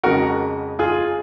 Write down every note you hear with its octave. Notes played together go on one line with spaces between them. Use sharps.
F2 C#3 G#3 F#4 A#4
F4 G#4